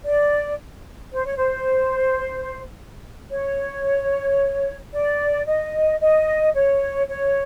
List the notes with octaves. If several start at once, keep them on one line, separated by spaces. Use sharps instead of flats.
D5
C5
C#5
C5
C#5
D5
D#5
D#5
C#5
C#5